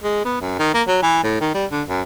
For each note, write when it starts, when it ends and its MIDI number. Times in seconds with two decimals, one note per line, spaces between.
0.03 0.21 56
0.25 0.36 59
0.41 0.59 42
0.59 0.71 51
0.74 0.82 58
0.87 0.99 54
1.02 1.21 52
1.23 1.38 45
1.40 1.53 51
1.54 1.66 55
1.71 1.82 50
1.88 2.02 42